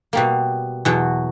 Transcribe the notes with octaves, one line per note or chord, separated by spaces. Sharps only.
B2 G3 A#3
E2 B2 F#3